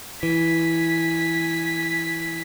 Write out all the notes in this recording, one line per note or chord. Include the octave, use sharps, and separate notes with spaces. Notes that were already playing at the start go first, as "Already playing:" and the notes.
E3 G#5 B6